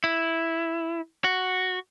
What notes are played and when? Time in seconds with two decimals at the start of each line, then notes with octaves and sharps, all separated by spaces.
0.04 E4
1.24 F#4